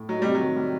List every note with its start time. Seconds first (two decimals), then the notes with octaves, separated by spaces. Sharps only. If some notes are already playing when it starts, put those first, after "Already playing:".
Already playing: A2
0.09 F#3 D#4
0.22 C3 G3
0.35 F#3
0.41 D#3
0.56 G3